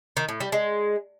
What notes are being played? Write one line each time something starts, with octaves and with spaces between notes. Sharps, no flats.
D#3
A2
G3
G#3